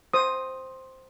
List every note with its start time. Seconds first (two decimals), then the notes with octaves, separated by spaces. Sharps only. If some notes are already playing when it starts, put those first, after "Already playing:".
0.14 C5 D#6